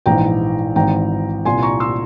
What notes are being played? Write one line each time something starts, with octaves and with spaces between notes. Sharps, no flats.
A#1 G#2 E3 G5 A#5
G#1 G#2 E3 G5 A#5
C2 A#2 G#5 C6
A#5 C#6
C6 E6